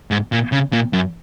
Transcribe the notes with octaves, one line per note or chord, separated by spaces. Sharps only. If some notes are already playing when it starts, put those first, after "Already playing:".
G#2
A#2
C#3
A#2
F#2